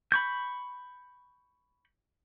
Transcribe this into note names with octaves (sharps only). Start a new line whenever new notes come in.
B5 C#6 G6